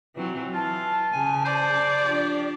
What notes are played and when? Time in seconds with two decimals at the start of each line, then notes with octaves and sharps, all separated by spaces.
0.16 E3 F#3 C4
0.54 E3 F4 A5
1.13 C#3 G#5
1.45 C5 D5
2.02 F3 D4 G4